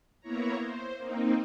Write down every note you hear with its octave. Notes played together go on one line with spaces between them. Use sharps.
A#3 B3 E4 C#5 A#5
C5
A#3 C4 D#4